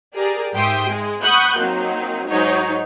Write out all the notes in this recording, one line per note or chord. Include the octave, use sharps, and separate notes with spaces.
G4 G#4 A#4 D5
G#2 G4 E5 G5 C6 D#6
G#3
F#5 B5 C#6 D#6 F#6 G6
F#3 A#3 C4 D#4
G#2 F#3 D#4 C#5